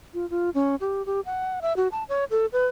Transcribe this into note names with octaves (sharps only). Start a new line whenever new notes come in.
F4
F4
C#4
G4
G4
F#5
E5
F#4
A5
C#5
A4
B4